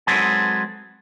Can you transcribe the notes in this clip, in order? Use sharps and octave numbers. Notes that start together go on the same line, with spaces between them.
F#3 G#3 C4 G#4 A4 B4